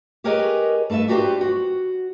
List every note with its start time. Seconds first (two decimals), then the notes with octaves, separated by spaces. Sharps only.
0.24 G4 G#4 A#4 B4 C#5 D#5
0.90 A3 A4 B4 D#5 E5
1.08 D4 F#4 G4 A4 B4 C5
1.41 F#4